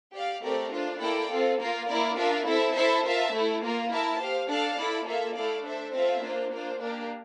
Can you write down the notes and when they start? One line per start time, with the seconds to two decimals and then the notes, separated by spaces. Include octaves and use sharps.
0.14 G4 D5 F5
0.42 A3 C4 G4 A#4 D5
0.72 D4 F4 C5
1.01 A#3 E4 A4 D5 G5
1.30 C4 F4 A4
1.59 A#3 F4 A#4
1.88 A#3 E4 A#4 D5
2.16 D4 F4 A#4 E5
2.46 C4 E4 A4 E5
2.75 E4 A4 C5 E5 A5
3.04 F4 A#4 E5 A5
3.33 A3 E4 A4
3.62 A#3 F4 A#4
3.91 E4 A#4 E5 A5
4.20 G4 C5 F5
4.49 D4 A4 D5 F5 A5
4.78 E4 A4 D5
5.07 A#3 F4 A4 E5
5.36 A3 E4 A4 D5 F5
5.65 D4 A4 C5 E5
5.94 C4 F4 A4 C5 E5
6.23 A#3 D4 F4 C5
6.51 A#3 D4 F4 C5
6.81 A#3 D4 G4 A#4